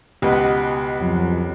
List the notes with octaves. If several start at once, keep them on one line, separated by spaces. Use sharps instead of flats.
C#2 B2 G4 B4 D#5 F#5
F2 F#3